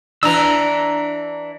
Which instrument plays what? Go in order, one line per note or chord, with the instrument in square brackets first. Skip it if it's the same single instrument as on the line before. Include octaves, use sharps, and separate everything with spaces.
[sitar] E3 D4 [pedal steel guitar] A#5 E6